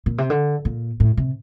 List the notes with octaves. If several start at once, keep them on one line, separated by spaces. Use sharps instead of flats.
A#2
C3
D3
A#2
A2
C3